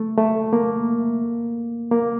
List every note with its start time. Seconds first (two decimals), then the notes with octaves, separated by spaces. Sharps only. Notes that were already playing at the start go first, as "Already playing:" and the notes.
Already playing: A3
0.18 A3
0.53 A#3
1.91 A#3